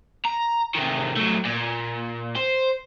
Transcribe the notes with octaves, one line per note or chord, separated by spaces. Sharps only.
A#5
C3 D#3
F#3 A3
A#2
C5